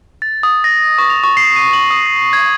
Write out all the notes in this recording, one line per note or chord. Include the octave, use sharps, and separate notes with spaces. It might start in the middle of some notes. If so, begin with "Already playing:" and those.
A6
D#6
A#6
C#6
F7
C#6
C7
D#7
F#7
D#6
A#6
G#6